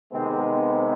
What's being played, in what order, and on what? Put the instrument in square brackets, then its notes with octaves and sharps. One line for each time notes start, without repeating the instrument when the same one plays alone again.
[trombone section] C3 D#3 G#3 B3 C4